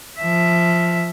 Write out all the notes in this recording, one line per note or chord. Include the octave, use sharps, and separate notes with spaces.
F3 E5